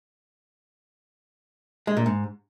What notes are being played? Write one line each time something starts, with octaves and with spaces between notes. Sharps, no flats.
G#3
A#2
G#2